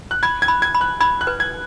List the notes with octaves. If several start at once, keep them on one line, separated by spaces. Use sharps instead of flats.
F#6
B5 G#6
G#6
B5
G#6
B5
F#6
B5 G#6
F#6
B4
G#6